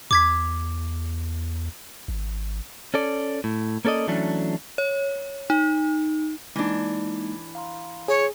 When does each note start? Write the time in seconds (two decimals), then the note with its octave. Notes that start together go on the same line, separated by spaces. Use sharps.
0.11 E2 D6 G#6 B6
2.08 G#1
2.94 C#4 A4 D5
3.44 A2
3.85 A#3 C#4 A4 D5 D#5
4.08 E3 F#3 A3 C#4 D4
4.78 C#5
5.50 D#4
6.56 E3 G#3 A#3 D4 D#4
7.55 F5 A#5 C6
8.08 G#4 C#5